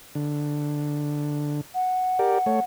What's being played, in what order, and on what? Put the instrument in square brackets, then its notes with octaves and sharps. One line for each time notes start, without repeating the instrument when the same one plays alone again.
[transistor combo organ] D3
[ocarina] F#5
[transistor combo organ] G4 A#4 D5
A3 C#5